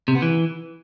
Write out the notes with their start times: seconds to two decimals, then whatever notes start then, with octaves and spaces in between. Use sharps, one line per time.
0.08 C3
0.15 B3
0.22 E3